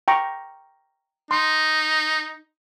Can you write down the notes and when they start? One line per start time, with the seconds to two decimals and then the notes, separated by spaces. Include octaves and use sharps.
0.08 G5 A#5 C#6
1.31 D#4 C6